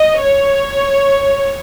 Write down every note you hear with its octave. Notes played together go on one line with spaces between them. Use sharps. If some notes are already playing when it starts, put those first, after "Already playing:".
Already playing: D#5
C#5